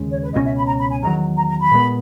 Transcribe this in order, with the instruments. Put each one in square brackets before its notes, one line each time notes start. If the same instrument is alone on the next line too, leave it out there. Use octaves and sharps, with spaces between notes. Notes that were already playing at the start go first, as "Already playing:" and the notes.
Already playing: [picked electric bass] D#2 C#3 G#3
[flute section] C#5
B4
[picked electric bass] C#2 B2 F#3 C#4 [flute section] D#5
[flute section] E5
B5
A#5
B5
G#5
[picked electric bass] E2 D#3 F#3 [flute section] A#5
[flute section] A#5
A#5
B5
[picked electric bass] A#2 G#3 B3